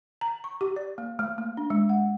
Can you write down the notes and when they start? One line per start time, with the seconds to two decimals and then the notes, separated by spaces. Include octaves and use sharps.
0.21 A#5
0.44 C#6
0.61 G4
0.76 D5
0.98 A#3
1.19 A3
1.38 A#3
1.57 D4
1.70 G#3
1.89 F#5